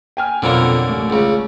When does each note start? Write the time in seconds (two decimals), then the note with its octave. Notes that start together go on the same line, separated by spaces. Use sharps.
0.17 G5 G#5 F6
0.42 F2 B2 D3 F#3 A#3
0.89 A1
1.10 C#2 C#3